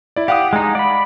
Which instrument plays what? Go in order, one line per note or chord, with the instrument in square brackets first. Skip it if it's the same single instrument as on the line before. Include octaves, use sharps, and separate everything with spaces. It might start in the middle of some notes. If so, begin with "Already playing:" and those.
[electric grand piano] E4 D5
[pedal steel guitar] G4 [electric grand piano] F5 F#5 D#6
[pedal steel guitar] G#3 D#4
D5 B5